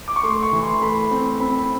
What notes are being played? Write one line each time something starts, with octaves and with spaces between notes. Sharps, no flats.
D6
C#6
A3 C6
C#6
E3
C6
A3 B5
C4
C4 B5